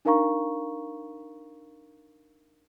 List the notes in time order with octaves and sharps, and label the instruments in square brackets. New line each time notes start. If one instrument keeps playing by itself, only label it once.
[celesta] D4 D#4 A#4 F5 A#5 C#6